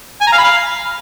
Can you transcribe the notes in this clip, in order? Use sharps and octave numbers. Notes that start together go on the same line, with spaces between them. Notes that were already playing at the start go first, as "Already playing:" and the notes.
G#5
A#5
F5
B5
F5